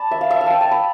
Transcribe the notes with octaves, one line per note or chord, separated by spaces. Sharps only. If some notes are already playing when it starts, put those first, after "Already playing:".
Already playing: D5 A5 B5
E5
F5
E5
F5
G5 A5
A5
B5